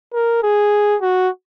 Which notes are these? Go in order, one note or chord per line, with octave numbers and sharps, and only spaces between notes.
A#4
G#4
F#4